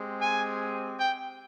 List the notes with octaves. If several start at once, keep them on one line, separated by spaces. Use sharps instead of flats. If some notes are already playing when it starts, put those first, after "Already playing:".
Already playing: G#3 C4 G4
G#5
G5